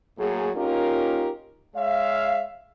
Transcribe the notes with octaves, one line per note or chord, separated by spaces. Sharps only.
A2 F#3 A#3 G#4
A#3 C#4 D#4 F4 G4 A#4
G#3 C#5 E5 F5